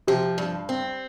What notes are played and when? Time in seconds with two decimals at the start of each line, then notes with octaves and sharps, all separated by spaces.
0.07 C3 F3
0.38 G2
0.69 C4